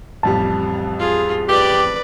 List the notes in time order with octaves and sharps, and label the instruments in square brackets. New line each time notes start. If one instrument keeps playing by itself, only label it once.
[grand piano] A1 F2 G3 [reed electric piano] A5
[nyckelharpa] F4 G#4
[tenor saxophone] G4 [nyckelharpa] B4 D5